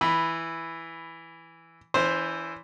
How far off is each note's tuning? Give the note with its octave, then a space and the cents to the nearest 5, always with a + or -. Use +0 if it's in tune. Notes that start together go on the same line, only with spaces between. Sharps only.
E3 +0 B5 +0
E3 +0 C#4 +45 C5 +0